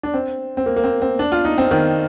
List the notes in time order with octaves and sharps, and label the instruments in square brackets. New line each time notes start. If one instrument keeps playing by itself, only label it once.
[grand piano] D4
C4
C4
A#3
A#3
C4
C4
D4
F4
D#4
C4
D#3